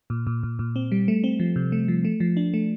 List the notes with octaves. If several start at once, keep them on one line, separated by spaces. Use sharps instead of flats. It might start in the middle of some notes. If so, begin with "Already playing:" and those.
A#2
A#2
A#2
A#2
C4
G3
A3
C4
F3
C3
A3
F3
A3
F3
D4
A3